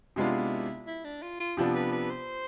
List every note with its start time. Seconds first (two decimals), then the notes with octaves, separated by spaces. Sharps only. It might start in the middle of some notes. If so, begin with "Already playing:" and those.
0.16 C3 G#3 B3 D4 E4 F4
0.87 E4
1.04 D4
1.23 F4
1.40 F4
1.57 C3 F3 B3 D4
1.75 B4
1.93 B4
2.10 C5